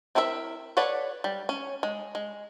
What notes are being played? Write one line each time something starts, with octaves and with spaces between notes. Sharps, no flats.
C4 E4 A#4 B4 E5
A4 B4 C#5 D5 F#5
G3
C#4
G#3
G#3